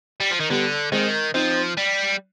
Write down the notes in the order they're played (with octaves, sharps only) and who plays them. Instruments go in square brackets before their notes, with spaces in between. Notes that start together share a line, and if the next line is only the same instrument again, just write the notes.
[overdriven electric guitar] G3
F3
D#3
[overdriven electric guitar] D3 [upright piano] G3 B3
[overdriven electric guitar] D#3 [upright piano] G#3 C4
[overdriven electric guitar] F3 [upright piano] C4 D#4
[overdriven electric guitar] G3